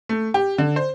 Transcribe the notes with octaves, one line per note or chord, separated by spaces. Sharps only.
A3
G4
D3
C5